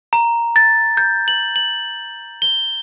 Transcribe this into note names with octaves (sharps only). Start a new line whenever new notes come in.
A#5
A6
G6
F#7
F#7
G7